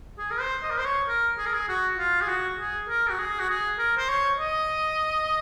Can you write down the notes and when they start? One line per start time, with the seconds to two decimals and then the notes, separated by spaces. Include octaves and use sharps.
0.18 G#4
0.31 A#4
0.41 C5
0.63 D#5
0.71 A#4
0.79 C5
0.86 C#5
1.08 A#4
1.38 G#4
1.46 A#4
1.53 G#4
1.69 F#4
1.98 F4
2.22 G#4
2.28 F#4
2.59 G#4
2.89 A#4
3.10 F#4
3.19 G#4
3.39 F#4
3.49 G#4
3.79 A#4
3.97 C5
4.09 C#5
4.39 D#5